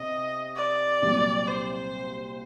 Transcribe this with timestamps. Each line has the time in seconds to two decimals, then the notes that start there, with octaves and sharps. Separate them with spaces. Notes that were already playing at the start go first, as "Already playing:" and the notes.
Already playing: C3 D#5
0.56 D5
1.02 C2 A#2 F#3
1.47 C5